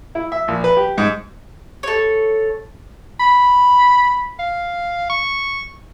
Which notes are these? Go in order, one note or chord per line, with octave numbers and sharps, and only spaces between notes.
E4
E5
A#1
B4
G4
G#2
A4 C#5
B5
F5
C#6